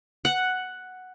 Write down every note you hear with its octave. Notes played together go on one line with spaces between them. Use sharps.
F#5